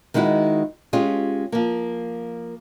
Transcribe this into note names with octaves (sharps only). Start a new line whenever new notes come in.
D#3 G#3 D#4 E4 F#4
G#3 C#4 F4 G4 G#4
F3 A#3